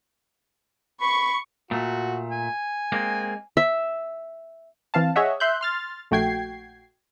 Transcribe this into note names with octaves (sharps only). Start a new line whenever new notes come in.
B5 C#6
A#2 A3 F#4
G#5
G#3 A#3 C4
E5
E3 C4 F5 A5
G#4 C#5 D#5 E5 F#5
E5 C6 F#6 G6
C6 F6 A6
A#1 A3 F#4 G5 G#6 C7